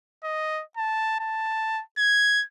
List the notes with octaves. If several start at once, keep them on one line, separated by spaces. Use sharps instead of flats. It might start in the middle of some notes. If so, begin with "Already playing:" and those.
D#5
A5
A5
G#6